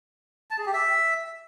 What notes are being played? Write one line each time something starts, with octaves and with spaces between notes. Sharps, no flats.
A5
G#4
G4
E5